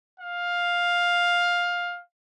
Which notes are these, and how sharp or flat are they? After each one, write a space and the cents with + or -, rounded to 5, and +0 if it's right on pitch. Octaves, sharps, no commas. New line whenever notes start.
F5 +10